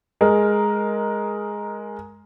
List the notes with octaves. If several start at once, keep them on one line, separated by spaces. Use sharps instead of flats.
G#3 A#4